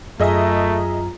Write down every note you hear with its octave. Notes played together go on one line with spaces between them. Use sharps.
F#2 A3 F4 G#4 D#5 E5 A#5